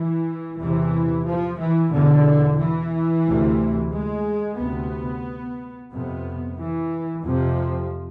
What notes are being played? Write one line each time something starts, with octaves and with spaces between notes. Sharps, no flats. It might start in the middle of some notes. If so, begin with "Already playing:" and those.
Already playing: E3
E2 C3 E3
F3
E3
E2 B2 D3
E3
D2 C3
G#3
D2 C3 B3
F2 C3 B3
E3
F2 C3 F3